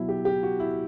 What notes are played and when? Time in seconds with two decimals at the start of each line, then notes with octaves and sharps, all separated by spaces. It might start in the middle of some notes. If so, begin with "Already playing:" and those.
Already playing: B2 F#3 E4
0.09 G4
0.25 G4
0.43 F#4
0.60 E4